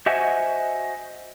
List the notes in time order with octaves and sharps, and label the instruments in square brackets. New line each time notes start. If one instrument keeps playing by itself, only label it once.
[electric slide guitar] F#4 C5 D#5 E5 F#5 G#5